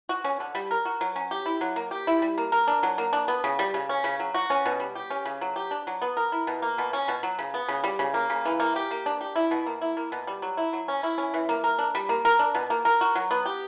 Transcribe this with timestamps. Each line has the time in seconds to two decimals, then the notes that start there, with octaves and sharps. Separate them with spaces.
0.09 F#4
0.24 C#4
0.40 D3
0.55 G3
0.71 A#4
0.85 F#4
1.01 F#3
1.16 C#4
1.31 G4
1.46 E4
1.61 F#3
1.76 A#3
1.91 G4
2.07 E4
2.22 G3
2.38 A#3
2.52 A#4
2.68 D4
2.83 F#3
2.98 A#3
3.13 D4
3.28 B3
3.44 C#3
3.59 G3
3.74 C#3
3.89 C#4
4.04 C#3
4.19 F#3
4.34 F#4
4.50 C#4
4.66 B2
4.80 G3
4.95 G4
5.10 C#4
5.25 C#3
5.41 F#3
5.56 G4
5.71 D4
5.87 F#3
6.02 B3
6.17 A#4
6.32 E4
6.47 B2
6.62 A#3
6.78 B2
6.93 C#4
7.08 B2
7.23 F#3
7.39 C#3
7.54 B3
7.68 C#3
7.84 G3
7.99 C#3
8.14 A#3
8.30 C#3
8.45 E3
8.60 A#3
8.76 G4
8.91 A#3
9.06 D4
9.21 G4
9.36 E4
9.51 B2
9.66 A#3
9.81 E4
9.97 A#3
10.12 B2
10.27 G3
10.42 F#3
10.57 E4
10.73 F#3
10.88 C#4
11.03 E4
11.18 C#4
11.34 E3
11.49 A#3
11.64 A#4
11.79 D4
11.95 G3
12.09 A#3
12.25 A#4
12.39 D4
12.55 B2
12.70 A#3
12.85 A#4
13.01 F#4
13.15 F#3
13.31 B3
13.46 G4